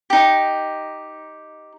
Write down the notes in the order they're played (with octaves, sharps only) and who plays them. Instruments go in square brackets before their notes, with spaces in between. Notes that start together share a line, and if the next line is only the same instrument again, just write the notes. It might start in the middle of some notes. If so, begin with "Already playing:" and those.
[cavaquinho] D#4 G4